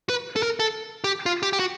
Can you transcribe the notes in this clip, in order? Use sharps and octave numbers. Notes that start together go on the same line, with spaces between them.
B4
A4
A#4
A4
G4
F4
G4
G4
F#4